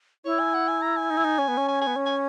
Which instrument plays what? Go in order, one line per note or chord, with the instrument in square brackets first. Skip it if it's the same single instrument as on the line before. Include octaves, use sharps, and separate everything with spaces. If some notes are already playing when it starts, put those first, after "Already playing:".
[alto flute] E4 [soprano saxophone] C#5
[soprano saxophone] G#5
F#5
G#5
A#5
G#5
[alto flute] D#4
E4
D#4
C#4
B3
C#4
[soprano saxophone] G#5
G#5
[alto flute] B3
C#4
[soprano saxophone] G#5